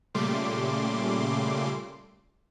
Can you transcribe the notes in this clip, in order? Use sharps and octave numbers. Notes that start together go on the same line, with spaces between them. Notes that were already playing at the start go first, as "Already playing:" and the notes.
A#2 C#3 G3 A3 C6 D6